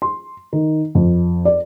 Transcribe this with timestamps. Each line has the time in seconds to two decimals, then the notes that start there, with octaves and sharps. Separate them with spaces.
0.02 C6
0.53 D#3
0.95 F2
1.45 D5